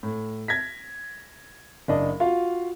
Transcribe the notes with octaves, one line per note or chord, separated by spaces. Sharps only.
A2
G#6 A#6 B6
F#1 D4 D#5
F4 F#4 F5